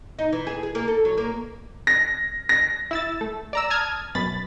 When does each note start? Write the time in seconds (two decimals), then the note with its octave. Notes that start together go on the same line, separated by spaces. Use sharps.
0.19 D#4
0.32 E3
0.47 G#4
0.63 G#4
0.75 A#3
0.88 A4
1.05 F#3
1.18 A#3
1.87 A#6
2.49 A#6
2.91 E4 E6 A6
3.21 A3
3.53 D5 A#5 E6
3.70 A5 D#6 F6 G#6
4.15 F#2 B2 B5 A6